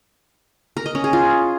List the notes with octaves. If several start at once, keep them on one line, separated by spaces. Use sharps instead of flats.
A#4
D#5
C#4
G#4
F4